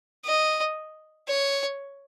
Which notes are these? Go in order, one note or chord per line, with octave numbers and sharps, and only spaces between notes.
D#5
C#5